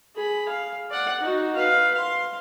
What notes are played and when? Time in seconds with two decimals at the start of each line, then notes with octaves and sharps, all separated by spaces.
0.16 G#4 B5
0.49 F5
0.91 D5 F#5
1.20 D#4 F#4
1.56 B4 F5
1.94 F5 C6